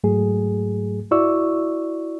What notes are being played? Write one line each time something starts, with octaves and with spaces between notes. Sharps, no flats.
G#2 F#3 A3 G#4
E4 F#4 D5 C#6 E6